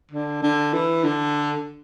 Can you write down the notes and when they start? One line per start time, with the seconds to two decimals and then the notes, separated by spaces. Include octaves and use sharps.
0.11 D3
0.43 D3
0.73 E3
1.04 D3